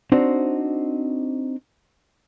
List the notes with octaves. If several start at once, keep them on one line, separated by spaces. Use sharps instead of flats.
C4 D4 D#4 F#4 C5